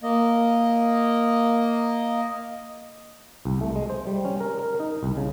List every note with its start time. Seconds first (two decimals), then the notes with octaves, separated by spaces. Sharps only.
0.03 A#3 D#5
3.45 C2
3.61 A3
3.75 G#3
3.90 C5
4.07 G3
4.25 C#4
4.40 A#4
4.59 A#4
4.80 D#4
5.03 C2
5.17 C#3